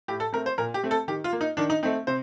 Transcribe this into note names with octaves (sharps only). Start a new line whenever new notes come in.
A2 G4
A4
A3 C4 A#4
C5
A#2 A#4
G4
A3 C4
A4
D#3 G4
F4
A#3
D#4
D#3 D4
D#4
A3 C4 D#4
C3 C5